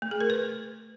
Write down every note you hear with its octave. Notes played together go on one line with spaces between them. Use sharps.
A3
G#4
A#4
B4